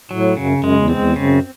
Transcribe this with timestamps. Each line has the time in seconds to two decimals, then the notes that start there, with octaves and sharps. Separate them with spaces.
0.11 A2 F#3
0.37 F#2 C#3
0.58 F#2
0.64 G#3
0.77 E2
0.90 C4
0.96 E2
1.16 F#2 C#3